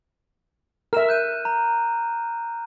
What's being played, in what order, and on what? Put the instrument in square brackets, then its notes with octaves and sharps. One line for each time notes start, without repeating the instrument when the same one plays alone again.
[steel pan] A#4 E5 [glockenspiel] F6 E7
[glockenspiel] F#6 G6 D#7
A#5